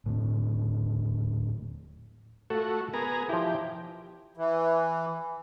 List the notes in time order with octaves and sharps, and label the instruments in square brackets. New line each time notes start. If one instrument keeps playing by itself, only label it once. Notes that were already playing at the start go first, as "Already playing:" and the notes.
[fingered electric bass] D#1 A2
[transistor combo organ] A3 F#4 [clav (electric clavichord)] F4 A4
[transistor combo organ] B3 G#4 A#5 [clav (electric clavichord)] A#4
[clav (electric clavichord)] F3 E4 [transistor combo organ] G4
[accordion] E3